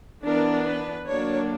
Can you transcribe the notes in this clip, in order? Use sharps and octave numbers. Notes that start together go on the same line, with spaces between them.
E3 B3 D4 A#4
B4
D3 F#3 A#3 D4 C#5